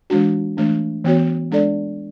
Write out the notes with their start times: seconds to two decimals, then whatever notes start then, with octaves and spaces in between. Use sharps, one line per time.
0.10 E3 G#3 D4 F#4
0.57 E3 A3 D4
1.04 E3 B3 F#4 C#5
1.51 G#3 D4 A4 D5